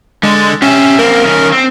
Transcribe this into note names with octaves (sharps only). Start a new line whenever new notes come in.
D3 G#3
C#4 G4 E5
A#3 C4 A#4
D#3 C#4
C4